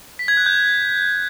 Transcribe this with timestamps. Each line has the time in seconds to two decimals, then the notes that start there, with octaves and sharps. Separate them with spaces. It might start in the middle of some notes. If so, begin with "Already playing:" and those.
0.19 B6
0.28 G#6
0.37 F#6
0.46 G6